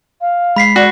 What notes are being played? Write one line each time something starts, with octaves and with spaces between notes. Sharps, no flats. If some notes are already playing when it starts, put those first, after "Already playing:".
F5
G#3 B5 B6 C7
F#4 D5